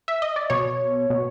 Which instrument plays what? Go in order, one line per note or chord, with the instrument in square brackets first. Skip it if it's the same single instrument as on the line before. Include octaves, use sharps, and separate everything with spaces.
[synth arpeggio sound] E5
D#5
D5
B2 C#5
B2